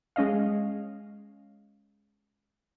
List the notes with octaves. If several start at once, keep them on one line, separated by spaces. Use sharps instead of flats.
G#3 C#4 D#5 F5